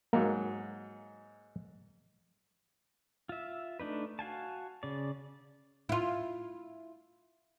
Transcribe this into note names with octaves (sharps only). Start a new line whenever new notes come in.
G#2 F#3 A#3
F4 E5
A3 D4 D#4 B4
F#4 F5 G#5 A5
C#3 D5
E4 F4